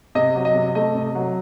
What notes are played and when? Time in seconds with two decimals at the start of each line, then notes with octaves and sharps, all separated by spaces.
0.15 C3 D#5
0.35 F#3
0.45 D#5
0.55 C3
0.75 A3 D#5
0.95 C3
1.15 F#3